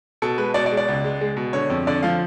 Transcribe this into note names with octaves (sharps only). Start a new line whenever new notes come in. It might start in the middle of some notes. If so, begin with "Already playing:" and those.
B2 A4
G#3 B4
B2 D5
D5
G#3
D5
C#2
G#3
G#3
B2
D3 C#5
F2
D3 D5
F3 F5